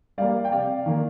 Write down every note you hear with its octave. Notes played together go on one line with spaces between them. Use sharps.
G3 A#3 D5 F5
G5
C3 D5 F5
D#3 A#3